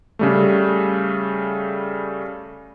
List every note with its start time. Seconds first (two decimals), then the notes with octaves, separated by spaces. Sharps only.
0.19 C#3 G3 A3